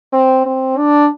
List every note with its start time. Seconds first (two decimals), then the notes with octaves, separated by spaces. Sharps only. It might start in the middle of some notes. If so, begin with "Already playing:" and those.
0.12 C4
0.46 C4
0.77 D4